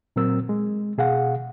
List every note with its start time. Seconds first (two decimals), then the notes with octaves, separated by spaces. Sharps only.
0.16 A#2 F#3 C4 A#4 E6
0.49 G#3
0.98 B2 G#4 F5 F#5